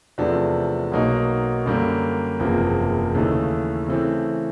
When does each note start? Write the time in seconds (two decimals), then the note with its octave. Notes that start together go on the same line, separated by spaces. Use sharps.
0.18 E2 C3 F3 A3 D4
0.92 B1 B2 F#3 A#3 D#4
1.66 F#2 D3 G3 A#3
2.40 F#1 E2 C3 F3 A#3
3.14 D#2 C#3 E3 A3
3.88 C#3 E3 A3 C4